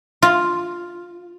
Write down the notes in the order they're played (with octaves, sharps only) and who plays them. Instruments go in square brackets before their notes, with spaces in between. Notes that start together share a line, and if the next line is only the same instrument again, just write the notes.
[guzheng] F4